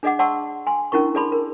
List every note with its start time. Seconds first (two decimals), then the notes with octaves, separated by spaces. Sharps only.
0.03 D4 G#4 D5 D#5 F#5 D6
0.19 D5 F#5 A5 C6 C#6 E6
0.67 G#5 C6
0.92 C#4 D4 E4 A#4 C#6
1.15 G#4 A4 D5 A5 B5 C6
1.32 A#4